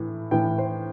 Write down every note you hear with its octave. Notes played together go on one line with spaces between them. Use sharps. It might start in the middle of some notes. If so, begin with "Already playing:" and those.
Already playing: A2 E3
A2 E3 G5
C5